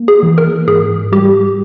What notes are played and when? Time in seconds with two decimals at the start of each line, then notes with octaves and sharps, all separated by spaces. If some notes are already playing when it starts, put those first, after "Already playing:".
Already playing: A#3
0.08 G#4
0.23 E3
0.38 A#4
0.67 G#2 G#4
1.12 G3 G4